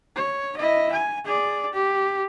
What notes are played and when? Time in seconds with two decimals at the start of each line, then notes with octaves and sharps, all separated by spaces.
0.16 C#5
0.57 E4 D#5
0.92 G#5
1.25 G#4 D5
1.73 G4